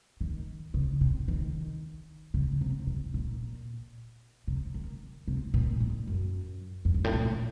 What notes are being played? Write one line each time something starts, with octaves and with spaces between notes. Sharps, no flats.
D#3
C#3
C3
D#3
C#3
C3
C3
A#2
C3
D#3
C3
A#2
A2
F#2
F2
F#2
A2
A#2